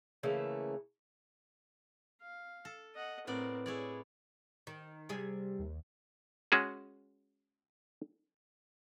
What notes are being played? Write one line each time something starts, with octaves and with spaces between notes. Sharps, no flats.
C#3 E3 A3 A#3
F5
A4
D#5 F#5
A2 B3 C4 A#4 D5
E4 G#4 C#5 D5
D#3
C3 G3 G#4
D#2
G#3 C#4 F#4 G#4